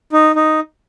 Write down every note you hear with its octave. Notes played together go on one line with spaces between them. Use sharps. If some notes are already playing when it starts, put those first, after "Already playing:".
D#4
D#4